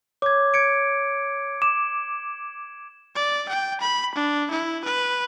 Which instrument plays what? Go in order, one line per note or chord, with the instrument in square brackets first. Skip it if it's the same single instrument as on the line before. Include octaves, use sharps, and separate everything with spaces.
[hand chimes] C#5 [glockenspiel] D6 G#6
[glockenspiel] G#6 C#7 D7
[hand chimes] D6 [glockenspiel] E7
[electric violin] D5
G5
B5
D4
E4
B4